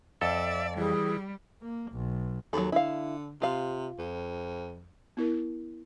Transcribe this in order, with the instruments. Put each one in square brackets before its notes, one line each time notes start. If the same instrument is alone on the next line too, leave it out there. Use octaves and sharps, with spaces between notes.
[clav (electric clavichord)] F2 A4 [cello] D5 [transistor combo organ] E5
[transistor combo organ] E3 [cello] G3 [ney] G#4
[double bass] A#3
B1
[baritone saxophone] D#2 [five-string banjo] F#3 A4
[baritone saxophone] D3 [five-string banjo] E4 F5
[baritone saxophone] C3 [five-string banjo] F4 F5
[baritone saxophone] F2
[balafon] B3 E4 A#4